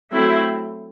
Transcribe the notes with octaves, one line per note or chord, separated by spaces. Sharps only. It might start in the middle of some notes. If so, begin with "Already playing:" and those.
F#3 A3 C4 E4